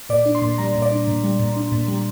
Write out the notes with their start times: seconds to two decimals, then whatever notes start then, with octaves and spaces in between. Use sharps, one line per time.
0.09 A#2 D5
0.26 D4
0.35 C6
0.42 A#2
0.58 G3 A#5
0.75 A#2
0.82 D5
0.92 D4
1.08 A#2
1.23 G3
1.39 A#2
1.56 D4
1.72 A#2
1.88 G3